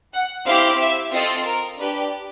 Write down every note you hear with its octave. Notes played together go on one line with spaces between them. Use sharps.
F#5
C4 E4 G4 F5
E5
C4 F4 A4 D#5
A#4
D4 G4 B4